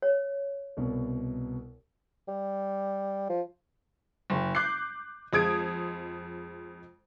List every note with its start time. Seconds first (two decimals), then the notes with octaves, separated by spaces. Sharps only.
0.02 C#5
0.77 C2 B2
2.28 G3
3.29 F3
4.30 F#1
4.55 D6 F#6 G6 C7
5.33 F2 G#3 D#6 G#6 D7